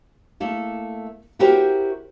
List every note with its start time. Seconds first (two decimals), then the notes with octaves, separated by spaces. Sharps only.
0.40 A3 A#3 E4
1.39 E4 F#4 G4 A#4 C5